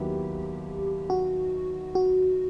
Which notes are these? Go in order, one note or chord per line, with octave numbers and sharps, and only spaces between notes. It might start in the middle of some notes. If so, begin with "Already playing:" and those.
Already playing: D#2 D#3 F#3 B3 E4 G4
F#4
F#4